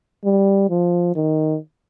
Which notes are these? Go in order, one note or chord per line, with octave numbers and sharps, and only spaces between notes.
G3
F3
D#3